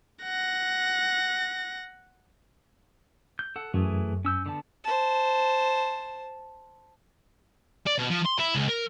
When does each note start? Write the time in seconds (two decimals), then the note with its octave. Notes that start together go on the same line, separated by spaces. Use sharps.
0.23 F#5 A#6
3.39 G6
3.56 A4 F#5
3.74 F#2 E3 A3 G#4
4.25 C#4 E6 G6
4.46 D3 B3 A5
4.84 C5 A5
7.87 D5
7.99 B2
8.11 F3
8.26 C6
8.40 E4
8.56 C#2
8.69 A#4